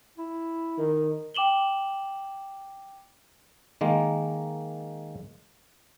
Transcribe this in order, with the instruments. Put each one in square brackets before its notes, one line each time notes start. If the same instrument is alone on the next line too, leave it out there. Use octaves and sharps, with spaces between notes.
[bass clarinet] E4
[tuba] D#3
[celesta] G5 D6 E7 F#7 G7
[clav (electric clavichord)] D#3 G#3 A#3